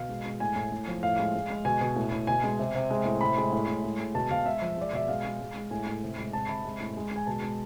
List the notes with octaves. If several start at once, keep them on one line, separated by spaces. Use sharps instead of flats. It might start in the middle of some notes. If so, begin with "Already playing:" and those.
Already playing: B2 F5
G#3
G#3
A2 G#5
A2
A2
F3
A2 F5
G#3
G#3
G#3
B2 G#5
B2
A2
A2
B2 G#5
G#3
C3
C3
G#3
A2
C3 B5
G#3
A2
A2
G#3
G#3
B2 A5
B2 F5
G#3 E5
F3
G#3 D5
B2 E5
G#3 F5
G#3
G#3
G#3
A2 G#5
A2
C3
G#3
C3 A5
C3 B5
G#3
A2
G#3
G#3 G#5
B2 A5
G#3